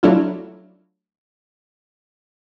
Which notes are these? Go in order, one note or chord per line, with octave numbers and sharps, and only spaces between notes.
F#3 A3 D4 E4 F4